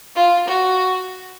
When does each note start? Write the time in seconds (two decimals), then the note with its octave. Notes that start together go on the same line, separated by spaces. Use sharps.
0.16 F4
0.48 F#4